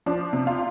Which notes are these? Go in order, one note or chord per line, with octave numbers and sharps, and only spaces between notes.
F3 D4
C3
F4